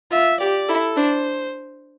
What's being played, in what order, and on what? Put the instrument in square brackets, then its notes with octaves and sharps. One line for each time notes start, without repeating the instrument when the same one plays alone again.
[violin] F4 [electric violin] E5
[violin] G4 [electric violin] D5
[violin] E4 [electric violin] A4
[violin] D4 [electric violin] C5